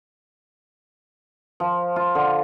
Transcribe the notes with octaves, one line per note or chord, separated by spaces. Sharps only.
F3
F4
D3